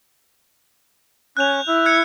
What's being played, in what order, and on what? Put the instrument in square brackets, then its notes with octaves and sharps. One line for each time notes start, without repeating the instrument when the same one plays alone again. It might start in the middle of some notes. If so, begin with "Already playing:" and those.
[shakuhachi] C#4 [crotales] F#6 G6 F7
[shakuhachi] E4
[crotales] F#6 G#6 C#7